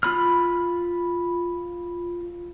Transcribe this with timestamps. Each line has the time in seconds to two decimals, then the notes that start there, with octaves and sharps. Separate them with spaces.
0.03 F4 B5 F6